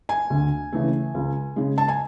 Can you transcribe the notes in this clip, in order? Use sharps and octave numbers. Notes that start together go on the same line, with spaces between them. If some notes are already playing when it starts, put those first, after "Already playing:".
G#5
D2
C#3 E3 A3
C#2
C#3 G#3
A5
G#5